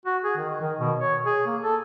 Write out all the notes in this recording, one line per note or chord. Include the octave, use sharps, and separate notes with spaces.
F#4
G#4
D#3
D#3
B2
C#5
G#4
A#3
A4